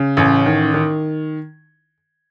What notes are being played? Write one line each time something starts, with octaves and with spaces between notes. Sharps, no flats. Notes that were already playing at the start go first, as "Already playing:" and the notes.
Already playing: C#3
A1 C#4
D#3
D#3